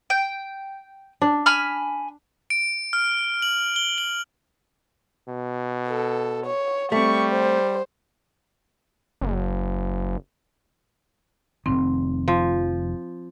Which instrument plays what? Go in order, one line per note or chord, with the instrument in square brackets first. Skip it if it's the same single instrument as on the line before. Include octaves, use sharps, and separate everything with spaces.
[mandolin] G5
[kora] D4
[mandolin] G#5 B5 F6
[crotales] D7
F6
F#7
G7
F#7
[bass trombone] B2
[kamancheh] A4
C#5
[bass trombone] G3 [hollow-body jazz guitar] A3 C4 [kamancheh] C#6
[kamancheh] C5
[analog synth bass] F#1
[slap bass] F1 C2 D#3 [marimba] C4
[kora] F3